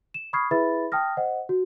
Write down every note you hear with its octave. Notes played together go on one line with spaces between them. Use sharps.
E7
B5 C#6 D#6 F6 G#6 C7
E4 G#4 B4 E5 B5 A6
G5 A5 D#6 F6 A#6
C5 D#5 F#5
F#4